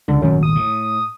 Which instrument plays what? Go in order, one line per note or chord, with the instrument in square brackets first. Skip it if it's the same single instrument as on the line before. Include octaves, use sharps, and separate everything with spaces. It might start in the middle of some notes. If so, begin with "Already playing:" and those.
[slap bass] C#2 [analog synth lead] D3
[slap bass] D#1 G#1 [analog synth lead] F#2
[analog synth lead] D#6
[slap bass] A2